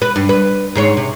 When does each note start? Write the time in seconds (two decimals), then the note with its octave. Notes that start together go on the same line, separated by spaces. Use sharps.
0.02 B4
0.16 G2
0.29 B4
0.75 G#2 G#4 C#5
0.97 C3